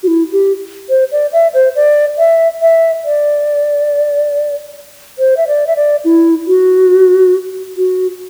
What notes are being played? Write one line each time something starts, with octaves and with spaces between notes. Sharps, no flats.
F#4
E4
G4
C5
D5
E5
C5
D5
E5
E5
D5
C5
E5
D5
E5
D5
E4
F#4
F#4